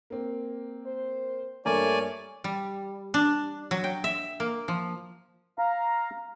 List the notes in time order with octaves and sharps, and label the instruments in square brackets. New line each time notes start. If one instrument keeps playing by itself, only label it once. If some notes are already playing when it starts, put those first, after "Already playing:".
[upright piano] A#3 C4
[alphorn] C5
[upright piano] G2 A#3 A#4 [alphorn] A3 [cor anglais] C#5 [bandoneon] D5 G#5
[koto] G3
D4
F#3
G5
E5
A#3
F3
[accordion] F5 A#5